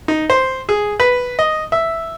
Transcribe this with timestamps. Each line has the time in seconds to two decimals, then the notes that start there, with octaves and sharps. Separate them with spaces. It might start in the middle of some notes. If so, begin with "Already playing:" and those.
0.08 D#4
0.30 C5
0.69 G#4
1.00 B4
1.39 D#5
1.72 E5